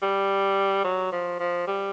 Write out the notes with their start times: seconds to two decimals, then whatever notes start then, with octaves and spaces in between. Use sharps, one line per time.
0.02 G3
0.84 F#3
1.12 F3
1.40 F3
1.67 G3